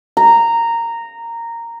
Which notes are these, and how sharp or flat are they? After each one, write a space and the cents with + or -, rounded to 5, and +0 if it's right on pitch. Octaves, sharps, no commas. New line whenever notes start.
A#5 -10